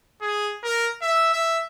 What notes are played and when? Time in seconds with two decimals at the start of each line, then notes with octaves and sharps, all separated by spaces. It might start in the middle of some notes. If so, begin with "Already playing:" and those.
0.22 G#4
0.64 A#4
1.02 E5
1.33 E5